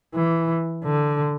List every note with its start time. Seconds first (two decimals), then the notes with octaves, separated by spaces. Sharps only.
0.15 E3
0.84 D3